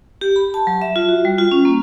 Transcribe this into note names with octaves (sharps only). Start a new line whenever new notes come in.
G4
B5
A5
F#3
E5
F4
F#4
G3
F4
C#4
A#3